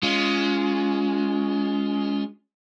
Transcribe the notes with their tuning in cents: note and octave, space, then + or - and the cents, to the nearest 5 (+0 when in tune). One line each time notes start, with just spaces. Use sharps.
G#3 +5 C#4 +25 F4 +0